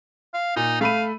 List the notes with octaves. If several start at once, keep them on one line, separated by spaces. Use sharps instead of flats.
F5
A#2 D#4
A3 F5 B5 D#7